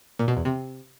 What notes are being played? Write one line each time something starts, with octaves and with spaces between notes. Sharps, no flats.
A#2
B2
E2
C3